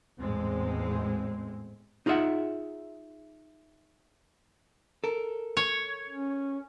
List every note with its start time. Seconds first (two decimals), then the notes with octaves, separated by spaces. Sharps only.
0.18 G#1 E2 A2 G#3 C4
2.06 D#4 F4 G#4 B4 E5 F#5
5.04 A4 A#4
5.57 C#5
6.09 C#4